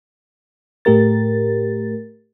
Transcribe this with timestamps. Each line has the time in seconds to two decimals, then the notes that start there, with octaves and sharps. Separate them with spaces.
0.85 A2 A3 G4 A#4 A6